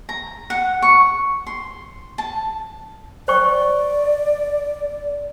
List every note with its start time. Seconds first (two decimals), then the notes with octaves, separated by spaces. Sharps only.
0.09 A#5
0.50 F#5
0.82 C#6
1.47 C6
2.18 A5
3.28 C5 D5 G5 C#6